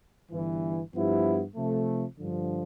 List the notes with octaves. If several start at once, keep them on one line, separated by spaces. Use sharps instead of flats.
G1 G2 E3
G2 F3 B3 E4 G4
C3 F3 A3
G2 D3 F3